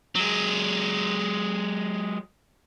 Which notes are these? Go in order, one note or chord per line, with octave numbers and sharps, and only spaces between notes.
F#3 G#3